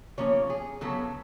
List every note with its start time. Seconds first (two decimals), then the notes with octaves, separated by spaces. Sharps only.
0.18 C#3 F3 A#3 C#4 C#5
0.50 G#4
0.81 C#3 F#3 B3 A4